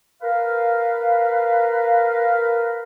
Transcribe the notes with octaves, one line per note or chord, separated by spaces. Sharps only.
A#4 B4 F5